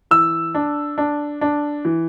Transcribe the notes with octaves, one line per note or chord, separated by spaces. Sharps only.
E3 E6
D4
D4
D4
E3